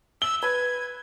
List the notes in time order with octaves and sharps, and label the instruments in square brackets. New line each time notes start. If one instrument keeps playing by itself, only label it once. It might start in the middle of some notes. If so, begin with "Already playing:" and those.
[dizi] E6 [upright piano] G7
[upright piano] B4 [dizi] G#6